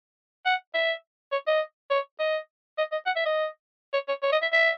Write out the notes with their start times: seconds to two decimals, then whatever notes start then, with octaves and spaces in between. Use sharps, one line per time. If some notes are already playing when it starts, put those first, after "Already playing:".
0.46 F#5
0.74 E5
1.32 C#5
1.47 D#5
1.90 C#5
2.19 D#5
2.78 D#5
2.92 D#5
3.06 F#5
3.16 E5
3.26 D#5
3.93 C#5
4.08 C#5
4.23 C#5
4.32 D#5
4.42 E5
4.53 E5